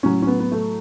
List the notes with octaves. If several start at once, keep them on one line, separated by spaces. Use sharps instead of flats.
A2 F#3 C#4
C#4
B3
B3
A3